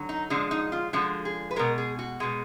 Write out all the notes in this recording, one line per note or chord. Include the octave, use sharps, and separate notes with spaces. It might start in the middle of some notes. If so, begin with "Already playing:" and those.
Already playing: D3 F#3
D#4
D3 F3 G#3 D4
D#4
F4
D3 F3 G#3 F#4
G#4
B4
B2 G#3 A#4
G#4
F#4
B2 G#3